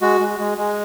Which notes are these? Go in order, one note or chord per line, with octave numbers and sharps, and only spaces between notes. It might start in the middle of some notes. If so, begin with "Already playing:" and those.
G#3 F#4
G#3
G#3
G#3